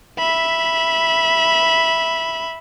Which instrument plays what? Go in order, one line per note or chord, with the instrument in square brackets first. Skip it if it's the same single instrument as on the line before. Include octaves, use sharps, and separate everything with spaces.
[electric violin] E5 B5